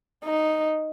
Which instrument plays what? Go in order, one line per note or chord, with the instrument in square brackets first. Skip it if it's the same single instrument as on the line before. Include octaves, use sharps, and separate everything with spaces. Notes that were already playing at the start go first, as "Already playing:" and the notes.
[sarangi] D#4